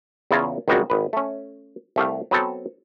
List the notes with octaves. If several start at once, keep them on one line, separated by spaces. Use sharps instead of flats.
E2 C#3 E4 F4 C#5 A#5
G#1 C#2 G3 G#3 A#3 F#4
G#1 B4
A3 C#4
C2 A3 G4 F5
F#3 B3 C4 A4